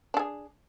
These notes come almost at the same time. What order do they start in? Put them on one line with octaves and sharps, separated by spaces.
D4 A4 G#4